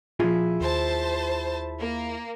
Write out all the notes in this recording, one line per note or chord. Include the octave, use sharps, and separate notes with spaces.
A#2 F3 E4 F4 G#4
D#2 C5 A5
A#3